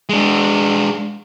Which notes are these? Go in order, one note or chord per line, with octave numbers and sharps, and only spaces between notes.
G#3 D4